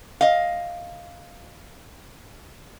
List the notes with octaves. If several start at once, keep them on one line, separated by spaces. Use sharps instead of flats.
D#5 F5